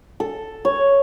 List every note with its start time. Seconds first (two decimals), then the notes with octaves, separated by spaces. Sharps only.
0.20 A4
0.65 C#5